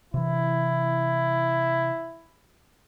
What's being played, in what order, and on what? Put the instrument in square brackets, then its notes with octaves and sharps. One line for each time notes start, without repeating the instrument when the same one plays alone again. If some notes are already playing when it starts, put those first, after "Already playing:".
[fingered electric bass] C3 E3 [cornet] E4